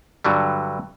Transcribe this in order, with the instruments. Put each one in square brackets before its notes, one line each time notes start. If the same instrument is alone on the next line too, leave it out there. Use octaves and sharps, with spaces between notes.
[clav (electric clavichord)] G2 D3 F#3 G3